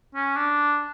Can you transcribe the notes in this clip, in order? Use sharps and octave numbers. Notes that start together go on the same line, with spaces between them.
C#4
D4